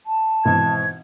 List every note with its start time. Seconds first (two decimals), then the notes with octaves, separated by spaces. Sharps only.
0.06 A5
0.45 G#1 B2 E3 G#6